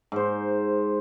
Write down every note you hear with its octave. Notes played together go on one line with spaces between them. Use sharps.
G#2 C5